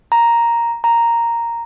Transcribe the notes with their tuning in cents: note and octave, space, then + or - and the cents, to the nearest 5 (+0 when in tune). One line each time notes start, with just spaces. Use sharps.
A#5 +0
A#5 -5